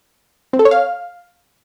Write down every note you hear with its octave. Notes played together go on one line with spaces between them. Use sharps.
C4
A4
C#5
F5